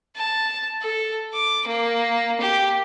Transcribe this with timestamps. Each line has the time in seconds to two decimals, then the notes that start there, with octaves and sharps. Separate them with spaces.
0.16 A5
0.81 A4
1.34 D6
1.67 A#3
2.40 G4